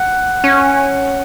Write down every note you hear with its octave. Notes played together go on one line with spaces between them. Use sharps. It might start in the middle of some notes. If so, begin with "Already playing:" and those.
Already playing: F#5
C#4